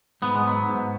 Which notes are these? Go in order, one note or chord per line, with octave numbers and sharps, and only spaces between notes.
G#2 B3
G#3
F#3 B3
G#2